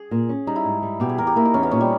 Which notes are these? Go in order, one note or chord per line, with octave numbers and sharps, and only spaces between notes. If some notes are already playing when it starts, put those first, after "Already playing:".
Already playing: G#4
A#2
C#4
G3 D#4
E4
G#2
G3
B2 G4
G#4
E2 A#4
G4
A#3 E4
D#4
E2 C#4
B3
A#2 C#4
G3